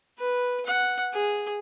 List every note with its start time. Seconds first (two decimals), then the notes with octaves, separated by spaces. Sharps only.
0.18 B4
0.66 F#5
1.14 G#4